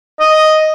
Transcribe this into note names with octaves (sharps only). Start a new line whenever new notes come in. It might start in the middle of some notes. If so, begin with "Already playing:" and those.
D#5